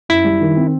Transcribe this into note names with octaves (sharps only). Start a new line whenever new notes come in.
F#2 E4
G3
D#3
C4